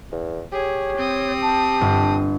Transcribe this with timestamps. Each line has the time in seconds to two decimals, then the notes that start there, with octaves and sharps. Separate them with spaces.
0.12 E2
0.52 G4 G#4 C#5
0.96 C4 D#6
1.41 A5
1.81 G1